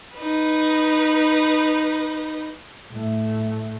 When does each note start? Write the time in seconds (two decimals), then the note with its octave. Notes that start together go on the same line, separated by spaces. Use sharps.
0.16 D#4 B4
2.92 A2 A3